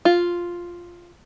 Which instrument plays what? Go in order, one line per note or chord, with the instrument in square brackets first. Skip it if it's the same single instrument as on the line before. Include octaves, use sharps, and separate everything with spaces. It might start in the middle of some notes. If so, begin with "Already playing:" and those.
[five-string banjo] F4